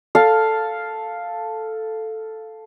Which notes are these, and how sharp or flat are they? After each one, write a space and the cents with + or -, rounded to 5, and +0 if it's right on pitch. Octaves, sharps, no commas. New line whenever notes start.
A4 +0 F5 +0